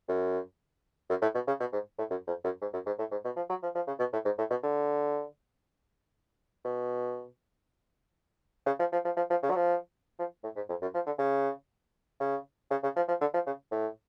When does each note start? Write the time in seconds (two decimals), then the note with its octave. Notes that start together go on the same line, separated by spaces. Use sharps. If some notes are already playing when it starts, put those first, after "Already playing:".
0.09 F#2
1.10 F#2
1.22 A2
1.35 B2
1.47 C#3
1.60 B2
1.73 G#2
1.98 A2
2.10 F#2
2.27 F2
2.44 F#2
2.62 G#2
2.73 F#2
2.86 G#2
2.99 A2
3.11 G#2
3.25 B2
3.36 F3
3.49 F#3
3.63 F3
3.75 F3
3.87 C#3
4.00 B2
4.13 A2
4.25 G#2
4.38 A2
4.50 B2
4.63 D3
6.65 B2
8.66 C#3
8.79 F3
8.93 F3
9.05 F3
9.17 F3
9.30 F3
9.42 C#3
9.50 F#3
9.55 F3
10.19 F3
10.43 A2
10.56 G#2
10.69 F2
10.82 F#2
10.94 F3
11.06 D3
11.19 C#3
12.20 C#3
12.71 C#3
12.83 C#3
12.96 F3
13.08 F3
13.21 D3
13.34 F3
13.46 C#3
13.72 A2